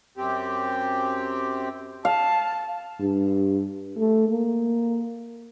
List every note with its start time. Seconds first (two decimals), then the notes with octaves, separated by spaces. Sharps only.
0.17 F#2 C4 G4
2.05 F5 A5
3.00 G2
3.98 A3
4.29 A#3